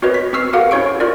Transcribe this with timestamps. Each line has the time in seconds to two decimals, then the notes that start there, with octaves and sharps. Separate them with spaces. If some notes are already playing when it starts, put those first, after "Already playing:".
0.02 C4 F#4 A#4 B4 C#5 D#5
0.14 B6
0.33 C4 B4 C#6 E6 F6 C7
0.53 F#4 G4 A4 A#4 F5 F#5
0.71 C#4 E4 C#5 C#6 D7
1.00 F4 A#4 D5